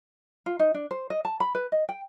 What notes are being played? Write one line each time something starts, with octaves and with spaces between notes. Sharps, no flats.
F4
D#4
D4
C5
D#5
A5
B5
B4
D#5
G5